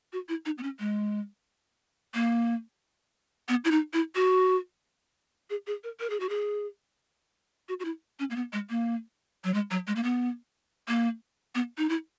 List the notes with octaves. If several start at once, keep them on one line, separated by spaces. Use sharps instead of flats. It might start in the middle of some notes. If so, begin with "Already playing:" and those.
F#4
E4
D#4
B3
C#4
G#3
A#3
B3
E4
D#4
E4
F#4
G#4
G#4
A#4
A#4
G#4
F#4
G#4
F#4
F#4
E4
C#4
A#3
B3
G#3
A#3
F#3
G#3
F#3
G#3
A#3
B3
A#3
B3
D#4
E4